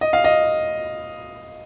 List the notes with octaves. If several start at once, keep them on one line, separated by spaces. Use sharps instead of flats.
D#5
F5
D#5